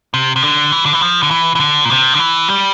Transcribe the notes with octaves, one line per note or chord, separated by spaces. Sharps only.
C3
C3
D3
E3
D3
E3
F3
D3
E3
E3
D3
A#2
C3
D3
E3
G3